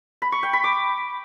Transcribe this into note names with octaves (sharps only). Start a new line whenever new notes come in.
B5
C#6
G5
B5
D6